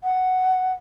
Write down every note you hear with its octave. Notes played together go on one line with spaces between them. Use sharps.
F#5